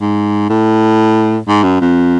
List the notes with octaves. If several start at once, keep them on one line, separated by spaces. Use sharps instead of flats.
G#2
A2
G#2
F#2
F2